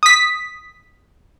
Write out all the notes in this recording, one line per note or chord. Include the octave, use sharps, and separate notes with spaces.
D#6 B6